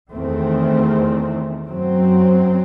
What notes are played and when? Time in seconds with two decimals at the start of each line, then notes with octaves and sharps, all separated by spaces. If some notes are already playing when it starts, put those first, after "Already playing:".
0.13 E2 D#3 A3 C4
1.67 F#2 F#3 C4